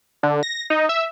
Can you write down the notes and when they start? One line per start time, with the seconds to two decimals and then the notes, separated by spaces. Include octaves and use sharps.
0.23 D3
0.43 A#6
0.70 D#4
0.89 E5